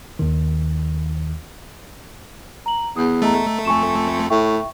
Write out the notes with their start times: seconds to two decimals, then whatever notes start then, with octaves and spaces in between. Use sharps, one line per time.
0.19 D#2 D#3
2.66 A#5 F#7
2.96 E2 D#6
3.22 A3 D#5 A#5
3.65 F2 G#5 C#6 E7
4.30 A2 E5 G5 C#6